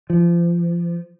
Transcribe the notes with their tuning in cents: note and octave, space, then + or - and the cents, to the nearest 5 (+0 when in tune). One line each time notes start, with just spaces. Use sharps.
F3 -30